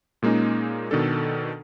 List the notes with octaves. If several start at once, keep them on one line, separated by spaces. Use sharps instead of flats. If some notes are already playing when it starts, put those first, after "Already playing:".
A#2 G#3 A#3 C#4 D#4
B2 D#3 D4 A4